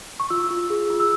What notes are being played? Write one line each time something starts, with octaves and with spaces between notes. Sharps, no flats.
C#6
F4 E6
F4
G#4
F4
E6